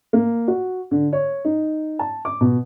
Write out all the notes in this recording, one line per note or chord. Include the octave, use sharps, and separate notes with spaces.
A#3
F#4
D3
C#5
D#4
A5
D6
B2